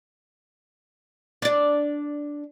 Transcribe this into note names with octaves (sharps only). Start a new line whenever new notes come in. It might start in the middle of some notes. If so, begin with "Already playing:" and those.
D4 D5